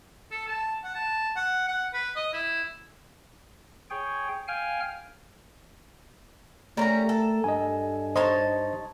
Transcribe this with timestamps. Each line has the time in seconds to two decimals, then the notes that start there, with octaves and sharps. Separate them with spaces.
0.32 A4
0.48 A5
0.84 F#5
0.95 A5
1.36 F#5
1.68 F#5
1.94 B4
2.16 D#5
2.33 E4
3.90 G#4 C#5 G5
4.48 F5 G5 G#5 F6
6.77 G3 A3 C#4 A#4 A#5
7.09 A4
7.44 G2 D#5 G#5
8.15 D#4 C5 C#5 D#5 A5 C6